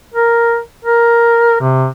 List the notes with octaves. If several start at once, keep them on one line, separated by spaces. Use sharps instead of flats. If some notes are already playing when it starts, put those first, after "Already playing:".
A#4
A#4
C3